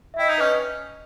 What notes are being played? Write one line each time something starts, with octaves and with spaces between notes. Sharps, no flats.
E5
E4 D#5 G5
D#4
C#4 B4 D#5